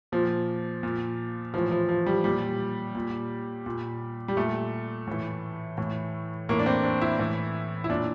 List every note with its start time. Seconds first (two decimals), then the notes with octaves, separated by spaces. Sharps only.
0.12 A#2 F3
0.83 A#2
1.54 A2 E3 F3
1.72 F3
1.89 F3
2.06 G3
2.24 A#2 G3
2.95 A#2
3.66 A#2
4.28 G3
4.37 A#2 A3
5.07 A2 E3
5.78 A2 E3
6.49 A2 E3 A#3
6.59 D4
6.66 C4
6.84 D4
7.01 E4
7.19 A2 E3
7.84 E4
7.89 A#2 D4